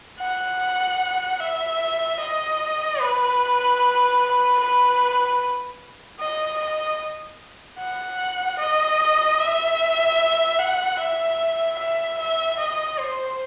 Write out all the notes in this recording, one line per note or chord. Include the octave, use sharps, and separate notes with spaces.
F#5
E5
D#5
B4
B4
D#5
D#5
F#5
D#5
E5
F#5
E5
E5
E5
D#5
C5